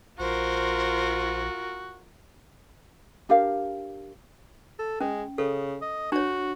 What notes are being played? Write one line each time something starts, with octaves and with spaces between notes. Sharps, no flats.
A#1 F4 F#4 A#4 C5
D4 G4 A#4 F5
A4
G#3 C#4
C#3 A4
D#5
D4 F#4 C#5